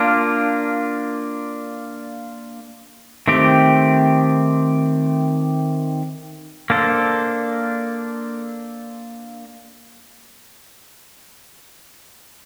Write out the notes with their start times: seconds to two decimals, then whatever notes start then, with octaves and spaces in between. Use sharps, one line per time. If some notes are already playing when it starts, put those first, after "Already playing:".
Already playing: A#3 D4 F4
3.28 D#3 A3 C4 G4
6.70 A#3 D4 A4 C5